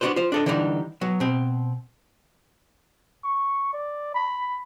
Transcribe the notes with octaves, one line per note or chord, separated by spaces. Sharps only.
B3 D4 D#4 F#4 B4 C5
F4 C5
D4 A4 D#5
D3 E3 G3 D4 D#4
F#3 B3
B2 C4
C#6
D5
B5